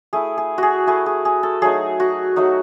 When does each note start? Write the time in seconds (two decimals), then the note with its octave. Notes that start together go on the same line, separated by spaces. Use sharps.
0.13 A3 E4 G#4
0.38 G#4
0.58 F#4 G#4
0.87 A3 E4 G#4
1.06 G#4
1.25 G#4
1.43 A4
1.62 F#3 A3 D#4 G#4
2.00 F#4
2.36 F#3 A3 D#4 F#4